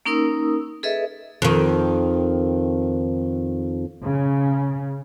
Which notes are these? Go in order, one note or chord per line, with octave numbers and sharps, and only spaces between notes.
A#3 C#4 D#4 A#4 D#6 E6
G#4 A4 B4 D#5 E5
F2 D#3
C#3